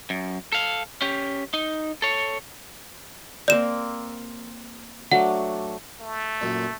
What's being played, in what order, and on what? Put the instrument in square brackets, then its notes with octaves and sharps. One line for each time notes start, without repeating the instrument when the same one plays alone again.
[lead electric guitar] F#2
A4 F5
C#4 G4
D#4
A4 C#5
[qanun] A#3 C4 A#4 [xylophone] D5 E7
[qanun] F#3 A3 D4 [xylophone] F#5
[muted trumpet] A3
[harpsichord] F#2 A#2